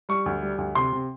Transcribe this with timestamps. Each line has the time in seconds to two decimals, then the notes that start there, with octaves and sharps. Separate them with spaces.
0.09 G3 C#6
0.26 D2
0.42 G3
0.58 D2
0.75 C3 C6
0.93 C3